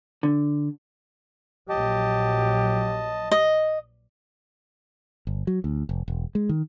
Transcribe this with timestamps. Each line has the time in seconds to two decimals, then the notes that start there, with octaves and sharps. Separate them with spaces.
0.23 D3
1.69 A#1 F#3 G4 D#5 A5
3.32 D#5
5.27 G1
5.47 F#3
5.64 D2
5.89 F1
6.08 E1
6.35 G#3
6.49 D#3